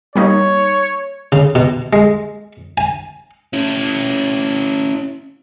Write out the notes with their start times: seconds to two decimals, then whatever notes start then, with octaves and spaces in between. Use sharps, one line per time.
0.16 G3 A#3 D#4 C#5
1.32 C#3
1.55 B2
1.93 G#3
2.78 G#5
3.53 C#4 E4